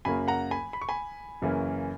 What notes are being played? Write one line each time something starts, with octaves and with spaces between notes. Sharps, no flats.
F#2 C#3 F#3 A#3 G#5 B5
F#5 A#5
G#5 B5
B5
C#6
G#5 B5
F#2 C#3 E3 A#3 C#4